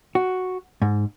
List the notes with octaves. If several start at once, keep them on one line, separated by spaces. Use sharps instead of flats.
F#4
G#2